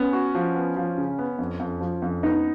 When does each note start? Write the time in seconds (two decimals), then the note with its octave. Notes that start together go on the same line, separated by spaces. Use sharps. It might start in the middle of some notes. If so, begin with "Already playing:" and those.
Already playing: B3 C#4
0.13 F#4
0.35 F3
0.56 B3
0.76 F3
0.98 C#3
1.19 B3
1.39 F2
1.60 F2
1.81 F3
2.02 F2
2.23 B3 D#4